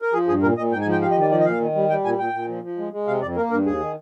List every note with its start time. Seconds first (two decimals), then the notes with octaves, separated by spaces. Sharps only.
0.02 A#4
0.13 F3 G#4
0.28 G2 G#4
0.42 A#2 A#4
0.57 A#2 D#5
0.72 G#2 G5
0.81 G#5
0.86 F3
0.92 G5
1.02 G3 F5
1.11 D#5
1.16 D#3 D5
1.30 F3 D5
1.40 D#5
1.45 A#2 F5
1.60 D#3
1.75 G3
1.89 G3 G5
2.04 A#2 G#5
2.18 A#2 G5
2.33 A#2
2.49 F3
2.63 F3
2.78 G#3
2.93 G#3
3.07 C3 F5
3.22 F2 D5
3.37 A#3 A#4
3.51 G2 A#4
3.66 D#2 G#4
3.80 D#3